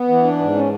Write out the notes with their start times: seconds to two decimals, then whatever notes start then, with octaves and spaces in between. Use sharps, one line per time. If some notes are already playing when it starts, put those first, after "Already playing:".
Already playing: B3
0.08 E3
0.23 D4
0.39 G#2
0.55 C#4